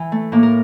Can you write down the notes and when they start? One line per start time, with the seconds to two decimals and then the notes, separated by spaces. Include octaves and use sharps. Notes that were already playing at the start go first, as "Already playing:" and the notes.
Already playing: E3
0.12 A3
0.32 A2 A#3
0.43 A#4